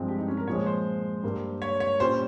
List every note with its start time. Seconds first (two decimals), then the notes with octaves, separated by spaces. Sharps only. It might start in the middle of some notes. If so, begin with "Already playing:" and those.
Already playing: G2 F3 G#3 C4
0.08 G4
0.18 D#4
0.28 C#4
0.37 A#4
0.47 A#2 F3 G#3 C#5
0.66 C5
1.23 G2 G3 A#3
1.62 C#5
1.80 C#5
2.00 A#2 G3 C#4 F4 C5